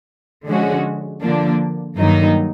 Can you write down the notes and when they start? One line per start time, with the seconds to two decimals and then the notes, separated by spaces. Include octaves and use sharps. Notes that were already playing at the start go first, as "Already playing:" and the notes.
0.46 D3 F3 G#3 C#4 F#4
1.22 D3 F3 A#3 D4
1.98 G2 D#3 F#3 A#3 D#4